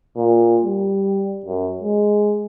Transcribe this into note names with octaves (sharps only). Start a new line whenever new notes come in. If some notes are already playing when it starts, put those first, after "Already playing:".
A#2
G3
F#2
G#3